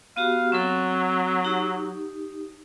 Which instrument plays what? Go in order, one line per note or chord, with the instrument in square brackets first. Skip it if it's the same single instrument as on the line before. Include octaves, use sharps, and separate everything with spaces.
[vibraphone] B3 F#4 G4 [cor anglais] F5
[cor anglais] F#3 [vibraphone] C4 A4
[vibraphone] D#4 G4